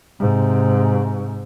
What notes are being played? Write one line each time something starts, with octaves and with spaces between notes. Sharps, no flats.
G#2 C3